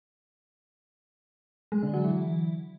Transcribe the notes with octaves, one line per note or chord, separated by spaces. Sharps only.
G#3
D3
F#3
E3